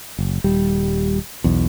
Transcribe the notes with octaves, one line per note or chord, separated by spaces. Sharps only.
F#1
D#1 G3
B1 E2